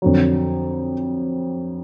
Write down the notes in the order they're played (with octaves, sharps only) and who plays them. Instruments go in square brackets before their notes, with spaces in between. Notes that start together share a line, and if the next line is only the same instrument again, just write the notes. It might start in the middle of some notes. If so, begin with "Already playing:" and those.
[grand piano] F2 D3 F#3